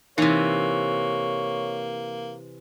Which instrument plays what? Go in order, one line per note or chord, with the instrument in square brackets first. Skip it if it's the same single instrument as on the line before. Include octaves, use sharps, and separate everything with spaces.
[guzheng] C3 E3 [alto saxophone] A#3 [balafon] D#4 [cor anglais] C#5